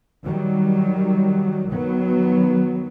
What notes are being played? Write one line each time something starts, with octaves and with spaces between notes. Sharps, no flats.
D#3 F#3 G3
D#3 F#3 B3